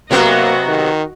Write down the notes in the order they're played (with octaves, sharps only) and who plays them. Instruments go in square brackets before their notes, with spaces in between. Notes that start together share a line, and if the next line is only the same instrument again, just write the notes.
[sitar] C3 F#3 B3 [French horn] A#3 [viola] F#4 D#5
[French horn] D#3